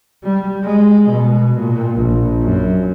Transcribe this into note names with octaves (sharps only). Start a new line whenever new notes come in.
G3
G#3
B2
A#2
A#1
F#2